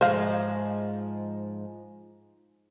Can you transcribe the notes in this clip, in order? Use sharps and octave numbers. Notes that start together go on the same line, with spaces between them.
G#2 F3 G#3 C5 F5